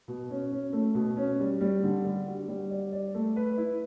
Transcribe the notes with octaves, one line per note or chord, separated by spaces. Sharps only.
B2
C#4
C#4
A3
B2
C#4
G3
G3
D3
G3
F#4
G3
D5
D5
A3
B4
E4